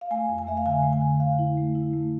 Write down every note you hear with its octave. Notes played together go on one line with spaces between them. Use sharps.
F5
A3 G#5
F2
G#5
A3 E5
F5
D3 G#5
A3
G#5
D3
D3 F5
E4
A3
E4
A3